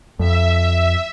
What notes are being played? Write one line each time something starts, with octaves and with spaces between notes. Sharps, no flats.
F2 E5